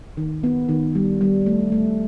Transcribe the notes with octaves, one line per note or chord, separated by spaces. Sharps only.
D#3
B3
D#3
G3
G3
A3
A3